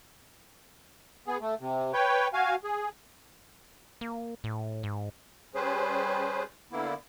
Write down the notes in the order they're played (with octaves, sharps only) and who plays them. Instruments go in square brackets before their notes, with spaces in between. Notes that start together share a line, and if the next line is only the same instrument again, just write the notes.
[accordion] B3 G#4
A3
C3
B4 C#5 G5
F#4 F5 G#5
G#4
[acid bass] A#3
A2
G#2
[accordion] G3 C#4 G#4 B4 C5
D3 A#3 B3 E4